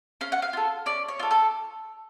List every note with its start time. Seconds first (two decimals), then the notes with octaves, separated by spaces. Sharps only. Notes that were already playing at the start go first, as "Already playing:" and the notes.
0.21 C#4 F5
0.32 F#5
0.42 F5
0.53 F4 A4
0.86 C#4 D5
1.09 C#5
1.19 F4 A4
1.31 A4